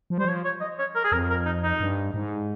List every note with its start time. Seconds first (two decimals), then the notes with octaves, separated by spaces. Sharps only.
0.10 F3
0.18 G3 C5
0.25 F3 C#5
0.44 C#5
0.61 D#5
0.79 C#5
0.95 A#4
1.04 G#4
1.12 F2 A#4
1.30 A#4
1.46 D#4
1.63 D#4
1.80 G2
2.14 G#2